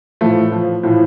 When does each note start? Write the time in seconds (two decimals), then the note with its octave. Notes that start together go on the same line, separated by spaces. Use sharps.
0.21 A2 E3 F3 A3
0.52 F3
0.83 A2 E3 F3